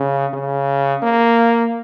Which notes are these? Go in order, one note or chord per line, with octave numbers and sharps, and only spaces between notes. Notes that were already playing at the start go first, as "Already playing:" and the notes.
Already playing: C#3
C#3
A#3